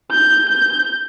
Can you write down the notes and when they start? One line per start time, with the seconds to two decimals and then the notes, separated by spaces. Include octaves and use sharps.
0.12 G6
0.49 G6